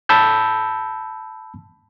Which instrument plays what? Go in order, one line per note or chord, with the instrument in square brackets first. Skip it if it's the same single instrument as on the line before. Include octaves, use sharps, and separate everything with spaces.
[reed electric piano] A5 B5 E6 G6